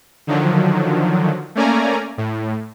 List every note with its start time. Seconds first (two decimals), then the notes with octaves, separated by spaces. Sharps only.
0.27 D3 D#3 F3 F#3
1.55 A3 A#3 C#4 D5 G#5 A#5
2.18 A2